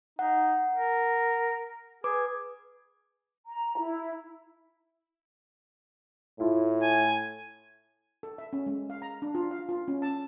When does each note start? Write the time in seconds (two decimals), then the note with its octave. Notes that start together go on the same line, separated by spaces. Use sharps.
0.19 D#4 F#5
0.75 A#4
2.04 G#4 B4 D6
3.45 A#5
3.78 E4
6.40 A2 E4 F4
6.82 G#5
8.23 A4
8.38 E5
8.53 C#4
8.66 G#3
8.90 F5
9.02 A#5
9.22 D4
9.35 F4
9.51 F5
9.69 F4
9.88 C#4
10.02 A5